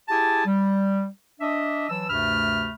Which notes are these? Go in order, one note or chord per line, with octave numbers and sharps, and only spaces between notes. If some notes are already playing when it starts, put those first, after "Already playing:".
E4 G4 G#4 G#5 A5
G3
D4 D#5 E5
E3 F#3 A5 E6
D2 G2 C3 A3 B5 F6